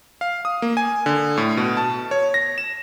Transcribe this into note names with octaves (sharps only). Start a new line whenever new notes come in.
F5
D#6
A#3
G#5
D3
A2
B2
A5
C#5
A#6
E7